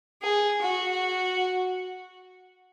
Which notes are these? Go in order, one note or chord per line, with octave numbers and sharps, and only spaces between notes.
G#4
F#4